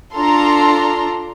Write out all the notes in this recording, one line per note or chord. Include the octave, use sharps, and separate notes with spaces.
D4 F4 A4 A#5 C6